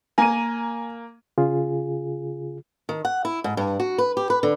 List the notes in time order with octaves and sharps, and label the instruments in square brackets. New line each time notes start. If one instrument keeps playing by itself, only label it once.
[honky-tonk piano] A#3 D#7 [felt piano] G#5 A#5
[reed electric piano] C#3 F4 G#4
[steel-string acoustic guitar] D#3
F#5
E4
G#2
G2
F#4
B4
G4
B4
D3